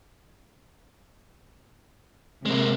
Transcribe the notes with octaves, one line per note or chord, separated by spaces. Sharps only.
C3 G#3 A#3